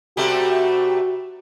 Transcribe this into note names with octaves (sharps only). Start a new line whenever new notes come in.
C3 G3 A3 F#4